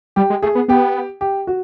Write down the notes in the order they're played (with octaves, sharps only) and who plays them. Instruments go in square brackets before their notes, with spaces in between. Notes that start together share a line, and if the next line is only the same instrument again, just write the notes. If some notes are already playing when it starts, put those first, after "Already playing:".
[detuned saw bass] G3 [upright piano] G4
[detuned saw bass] G#3
[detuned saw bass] A3 [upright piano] G#4
[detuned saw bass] B3
[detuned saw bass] B3 [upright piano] G4
[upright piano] G4
F#4